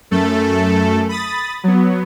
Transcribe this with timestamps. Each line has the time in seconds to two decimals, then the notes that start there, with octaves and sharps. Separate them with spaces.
0.11 F#2 A3 A4
1.09 B5 D#6 A6
1.64 F#3 B3